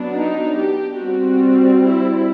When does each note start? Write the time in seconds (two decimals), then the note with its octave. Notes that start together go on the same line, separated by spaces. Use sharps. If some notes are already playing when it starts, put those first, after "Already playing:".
Already playing: F#3 B3 D4
0.15 D#4
0.57 G4
0.99 G3 C4 F#4
1.84 E4